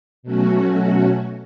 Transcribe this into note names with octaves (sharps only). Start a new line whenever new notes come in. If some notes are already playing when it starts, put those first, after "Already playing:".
B2 F#3 A3 C#4 F#4